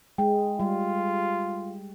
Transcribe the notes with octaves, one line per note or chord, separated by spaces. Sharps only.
G#3 G5
G3 F4